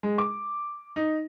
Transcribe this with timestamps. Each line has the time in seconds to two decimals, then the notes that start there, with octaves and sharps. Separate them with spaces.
0.03 G#3
0.18 D6
0.96 D#4